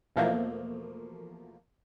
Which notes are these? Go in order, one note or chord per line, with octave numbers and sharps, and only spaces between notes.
E2 B2 F3 A3 A#3